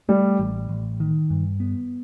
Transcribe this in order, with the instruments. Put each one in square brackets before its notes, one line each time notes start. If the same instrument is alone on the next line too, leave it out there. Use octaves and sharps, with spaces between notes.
[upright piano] G3 [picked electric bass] A3
[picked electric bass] A1
A1
D#3
G2
B3